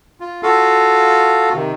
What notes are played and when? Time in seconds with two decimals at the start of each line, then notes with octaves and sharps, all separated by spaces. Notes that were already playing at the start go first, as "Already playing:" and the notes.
0.20 F4
0.43 F4 F#4 A4 F5
1.54 C3 D#3